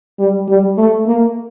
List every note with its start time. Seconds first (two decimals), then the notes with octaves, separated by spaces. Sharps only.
0.19 G3
0.48 G3
0.78 A3
1.07 A#3